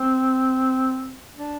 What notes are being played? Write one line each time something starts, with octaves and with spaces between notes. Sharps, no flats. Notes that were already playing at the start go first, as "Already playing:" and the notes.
Already playing: C4
D4